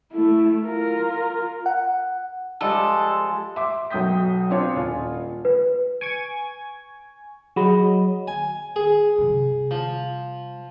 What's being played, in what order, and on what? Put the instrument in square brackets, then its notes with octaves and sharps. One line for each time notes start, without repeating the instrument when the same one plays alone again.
[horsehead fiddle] A3 E4
F4 A#4
[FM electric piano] F#5
[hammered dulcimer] F3 G3 G#3 [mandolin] A4
[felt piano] E5 C6 D6
B1 F#3 G5 D#6 G6 B6
C4 D4 F4 C#5
D#1 F4 G#5
[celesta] B4
[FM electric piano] G#5 C#6 G#6 [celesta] D7
[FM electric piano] F#3 D#5 [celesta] G#4 B5
[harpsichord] G#5
G#4
[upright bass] C3 G3
[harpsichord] F3